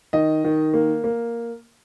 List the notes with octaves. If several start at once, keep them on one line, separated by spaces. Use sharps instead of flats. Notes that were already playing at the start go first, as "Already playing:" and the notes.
D#3 D#5
D#3
A#3
A#3